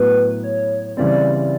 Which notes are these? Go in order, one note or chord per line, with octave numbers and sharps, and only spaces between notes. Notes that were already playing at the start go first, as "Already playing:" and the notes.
Already playing: A2 F#3 B3 B4
C#5
C#3 E3 G3 C4 D5